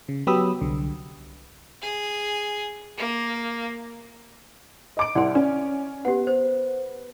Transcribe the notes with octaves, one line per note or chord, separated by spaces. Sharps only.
C#3
F#3 B3 G4 B5 D#6 E6
C2 D3
G#4
A#3
D#5 D6 D7
C2 E4 D5 F#5 C6
C#4 D5
B3 G4 F#5
C5